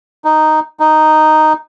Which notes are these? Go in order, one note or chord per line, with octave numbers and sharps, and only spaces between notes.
D#4
D#4